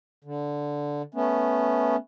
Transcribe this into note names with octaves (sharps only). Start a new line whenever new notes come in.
D3
A3 B3 C#4